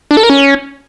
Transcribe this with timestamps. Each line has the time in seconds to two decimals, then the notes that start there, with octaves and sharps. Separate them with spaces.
0.11 D4
0.17 A4
0.23 A#4
0.30 C#4